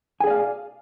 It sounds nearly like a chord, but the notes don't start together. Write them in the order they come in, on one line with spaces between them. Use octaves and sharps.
G#5 G#4 D5 F5